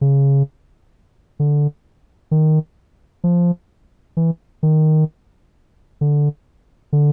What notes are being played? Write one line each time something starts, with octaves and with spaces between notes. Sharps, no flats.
C#3
D3
D#3
F3
E3
D#3
D3
D3